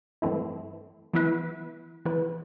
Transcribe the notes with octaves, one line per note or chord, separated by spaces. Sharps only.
G2 E3 A3 C4 E4
E3 B3 E4 B4
E3 B3 E4 B4